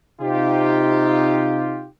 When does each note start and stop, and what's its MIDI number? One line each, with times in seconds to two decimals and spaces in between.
0.21 1.87 48
0.21 1.87 63
0.21 1.87 65
0.21 1.87 67